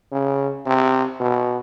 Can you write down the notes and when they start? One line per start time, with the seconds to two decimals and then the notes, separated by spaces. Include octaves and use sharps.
0.12 C#3
0.66 C3
1.20 B2